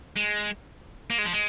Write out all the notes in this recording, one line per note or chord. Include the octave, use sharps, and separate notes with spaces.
G#3
A#3
G#3
F3
G#3